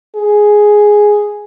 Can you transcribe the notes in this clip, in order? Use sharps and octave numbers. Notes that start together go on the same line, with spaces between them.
G#4